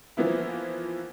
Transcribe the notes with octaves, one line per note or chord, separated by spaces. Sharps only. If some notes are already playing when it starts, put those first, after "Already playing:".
E3 F3 A#3 B3 E4